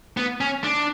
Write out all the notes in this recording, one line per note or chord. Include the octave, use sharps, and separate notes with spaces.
B3
C#4
D4